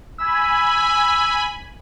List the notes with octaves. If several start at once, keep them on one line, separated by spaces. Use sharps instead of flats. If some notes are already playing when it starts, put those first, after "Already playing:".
G#5 B5 E6